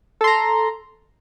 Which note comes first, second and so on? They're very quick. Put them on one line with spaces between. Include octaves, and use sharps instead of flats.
A4 C6 A#5